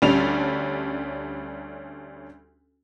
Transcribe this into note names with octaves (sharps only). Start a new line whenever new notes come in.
D2 G3 C#4 D4 F7